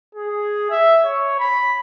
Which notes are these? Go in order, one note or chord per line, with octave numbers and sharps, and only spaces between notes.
G#4
E5
C#5
B5